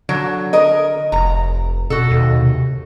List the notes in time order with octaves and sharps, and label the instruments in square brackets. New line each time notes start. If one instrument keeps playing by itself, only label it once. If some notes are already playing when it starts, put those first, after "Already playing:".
[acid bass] D3 [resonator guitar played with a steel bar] F#3
[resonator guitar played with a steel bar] A#4 D#5
[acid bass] F1 [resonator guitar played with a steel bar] A#5
[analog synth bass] B2 [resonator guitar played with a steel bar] F#4 A4
[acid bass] D#2
[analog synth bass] C3